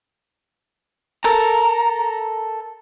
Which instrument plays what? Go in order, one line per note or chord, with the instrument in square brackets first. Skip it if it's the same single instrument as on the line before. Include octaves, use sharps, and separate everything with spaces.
[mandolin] A4 A#4 [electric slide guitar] A#5